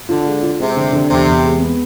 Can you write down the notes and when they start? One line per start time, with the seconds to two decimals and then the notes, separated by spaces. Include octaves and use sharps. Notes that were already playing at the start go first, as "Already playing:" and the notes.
0.09 D3 F4
0.26 G#3
0.42 F4
0.60 C3 G#3
0.77 D3
0.93 D3
1.10 E2 C3
1.27 E2
1.44 G#3
1.60 B3